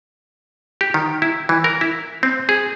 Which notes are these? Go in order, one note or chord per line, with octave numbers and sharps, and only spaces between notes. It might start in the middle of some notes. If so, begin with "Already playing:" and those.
G4
D#3
E4
E3
A#4
E4
C4
G#4